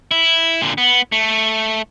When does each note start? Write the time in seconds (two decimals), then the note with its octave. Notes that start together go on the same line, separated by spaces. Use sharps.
0.11 E4
0.61 A#2 D3
0.78 B3
1.12 A3